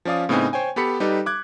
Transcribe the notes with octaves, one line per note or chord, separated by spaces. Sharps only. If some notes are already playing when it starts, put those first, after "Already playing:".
F3 C#4 D5 F5 D#6
A2 C#3 B3 C4 D#4 G#5
C5 C#5 G5 G#5
B3 G4 A4 B5 B6 C#7
G3 D#4 G4 A4 B4
D6 F#6 G#6